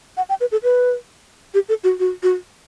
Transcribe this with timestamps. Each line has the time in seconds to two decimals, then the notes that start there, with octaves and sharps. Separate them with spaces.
0.17 F#5
0.29 G5
0.41 B4
0.52 A4
0.63 B4
1.54 G4
1.69 A4
1.84 F#4
2.00 F#4
2.23 F#4